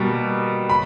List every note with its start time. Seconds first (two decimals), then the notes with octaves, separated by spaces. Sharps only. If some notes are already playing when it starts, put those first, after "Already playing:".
Already playing: B2 G3 A#3
0.69 B5